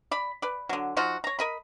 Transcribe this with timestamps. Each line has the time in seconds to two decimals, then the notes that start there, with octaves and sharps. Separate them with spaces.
0.11 D5 B5
0.42 B4 D5
0.69 D3 F#3
0.97 F3 D#4 F4 F#4
1.24 C#5 A#5
1.39 A#4 D#5 B5